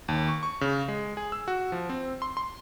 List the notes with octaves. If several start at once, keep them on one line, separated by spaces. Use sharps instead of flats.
D#2
C#6
C#6
C#3
G#3
G#4
E6
F#4
F3
C4
C6
C6